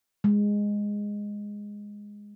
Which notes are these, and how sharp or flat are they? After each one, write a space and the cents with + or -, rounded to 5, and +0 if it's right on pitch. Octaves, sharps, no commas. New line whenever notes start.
G#3 -10